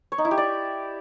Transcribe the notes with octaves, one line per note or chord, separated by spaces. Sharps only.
C#5
D#4
E4
G4
D5